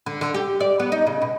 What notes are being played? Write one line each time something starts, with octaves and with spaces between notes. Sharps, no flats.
D3
D3
G4
D5
B3
D#4
C#3
B2